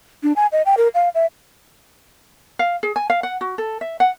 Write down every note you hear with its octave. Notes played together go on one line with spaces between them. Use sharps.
D4
G#5
D#5
G5
A#4
F5
E5
F5
G#4
G#5
F5
F#5
F#4
A4
E5
F#5